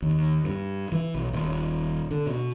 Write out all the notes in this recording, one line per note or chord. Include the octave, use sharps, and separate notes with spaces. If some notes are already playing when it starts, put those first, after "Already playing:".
D#2
G2
E3
B1
D#1
D3
B2